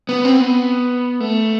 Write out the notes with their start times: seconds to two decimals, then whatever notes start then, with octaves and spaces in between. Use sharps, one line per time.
0.09 B3
0.25 C4
0.41 B3
1.20 A3